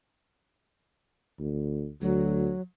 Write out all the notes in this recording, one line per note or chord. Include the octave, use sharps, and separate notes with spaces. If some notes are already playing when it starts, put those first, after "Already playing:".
D2
D2 F#3